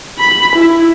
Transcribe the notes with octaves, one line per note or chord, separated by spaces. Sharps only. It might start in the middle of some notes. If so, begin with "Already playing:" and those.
B5
E4